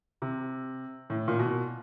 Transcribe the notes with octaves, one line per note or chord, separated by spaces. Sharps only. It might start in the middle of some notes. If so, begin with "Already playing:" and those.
C3
A2
A#2
B2